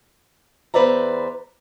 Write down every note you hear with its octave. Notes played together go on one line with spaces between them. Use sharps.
E2 B4 C5 D5 E5 A#5